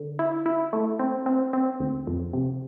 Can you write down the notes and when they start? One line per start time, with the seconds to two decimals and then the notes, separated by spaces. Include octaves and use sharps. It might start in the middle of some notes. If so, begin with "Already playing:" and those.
Already playing: D3
0.19 E4
0.46 E4
0.73 A3
0.99 C4
1.26 C4
1.53 C4
1.80 D2
2.07 F2
2.33 C3